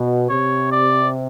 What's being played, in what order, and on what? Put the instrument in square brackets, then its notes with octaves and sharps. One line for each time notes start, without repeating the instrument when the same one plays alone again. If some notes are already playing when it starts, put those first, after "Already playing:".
Already playing: [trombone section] B2
[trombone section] C3 [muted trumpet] C#5
[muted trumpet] D5